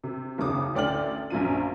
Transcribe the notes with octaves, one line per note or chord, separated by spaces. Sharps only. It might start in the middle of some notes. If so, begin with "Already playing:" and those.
C3
F#1 D#2 C#3 D6 D#6
A1 D2 D5 G5 F6 F#7
A#1 F#2 F4 D#7